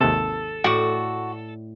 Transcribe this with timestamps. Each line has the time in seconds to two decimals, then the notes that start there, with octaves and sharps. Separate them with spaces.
0.01 G#1 D#2 C3 A4
0.64 A2 F#4 D5